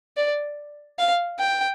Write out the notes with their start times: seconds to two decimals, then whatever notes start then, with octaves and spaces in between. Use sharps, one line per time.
0.17 D5
0.99 F5
1.39 G5